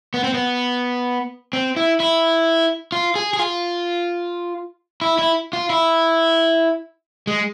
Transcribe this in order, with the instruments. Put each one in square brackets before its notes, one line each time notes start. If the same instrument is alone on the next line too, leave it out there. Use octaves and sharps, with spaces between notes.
[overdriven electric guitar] B3
C4
B3
C4
E4
E4
F4
G#4
G#4
F4
E4
E4
F4
E4
G#3